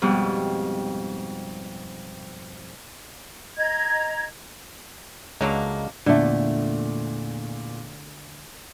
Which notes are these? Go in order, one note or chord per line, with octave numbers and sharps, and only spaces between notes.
F2 G#2 B2 G3
D#5 A#5 G#6
C#2 D3 F#3 G#3 A#3
E2 A#2 D3 A3